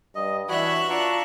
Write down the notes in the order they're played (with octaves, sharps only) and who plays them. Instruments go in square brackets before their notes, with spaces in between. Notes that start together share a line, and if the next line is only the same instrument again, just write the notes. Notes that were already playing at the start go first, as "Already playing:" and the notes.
[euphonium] G2 [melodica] D#5
[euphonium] E3 [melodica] D4 C#5 B5 [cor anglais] F#4 [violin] E5 F#6
[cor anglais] D4 [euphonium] F4 [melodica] A#5 C#6